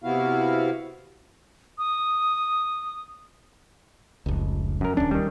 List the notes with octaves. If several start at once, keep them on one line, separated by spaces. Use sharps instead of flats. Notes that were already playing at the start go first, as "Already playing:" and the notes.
C3 B3 E4 F#4 F5
D#6
F1 C#2
F#2 A#4
D1 D#2 C#4 D4
D#3 G3